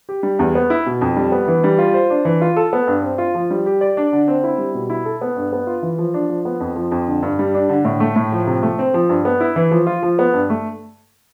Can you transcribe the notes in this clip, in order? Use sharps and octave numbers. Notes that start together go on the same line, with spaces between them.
G4
G3
E2
B3
E4
B2
F2
G3
B3
E3
G3
F4
C5
D4
E3
F4
A4
B3
G2
C4
F4
F3
G3
G4
D5
D4
D3
C4
E4
G3
B2
E4
A4
B3
G2
B3
F4
E3
F3
D4
F3
B3
F2
F3
F2
D3
G2
G3
D4
D3
A2
A3
A2
F3
C3
A3
C4
F3
G2
B3
E4
E3
F3
F4
F3
B3
G2
A3